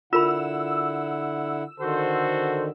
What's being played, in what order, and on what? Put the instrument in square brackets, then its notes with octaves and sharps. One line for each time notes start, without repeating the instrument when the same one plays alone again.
[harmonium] D3 E4 F#5 [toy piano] F4 A#4 B5 [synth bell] E6
[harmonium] D3 D#3 [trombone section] F#4 A4 C5